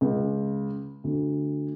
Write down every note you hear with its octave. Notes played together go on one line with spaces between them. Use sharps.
C#2
D2